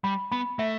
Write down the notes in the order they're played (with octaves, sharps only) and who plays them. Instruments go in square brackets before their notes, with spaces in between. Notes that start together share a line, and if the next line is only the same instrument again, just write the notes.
[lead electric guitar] G3 [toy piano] B5
[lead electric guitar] B3 [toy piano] B5
[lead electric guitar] A3 [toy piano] E5